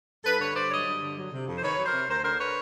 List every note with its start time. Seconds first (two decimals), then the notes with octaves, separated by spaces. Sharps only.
0.24 G2 A4 B4
0.40 D3 B4 C#5
0.55 G2 C5 D5
0.70 F#3 C#5 D#5
0.86 G2
1.01 D3
1.16 F#3
1.31 C3
1.48 F2
1.58 C5
1.62 D#3 B4 C#5
1.78 F#3
1.85 A#4 C5
1.93 C3
2.08 D2 A#4 C5
2.24 D3 A#4 C5
2.40 B4 C#5